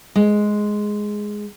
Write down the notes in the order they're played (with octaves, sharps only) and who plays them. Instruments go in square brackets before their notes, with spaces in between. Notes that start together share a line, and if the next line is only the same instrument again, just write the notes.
[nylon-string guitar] G#3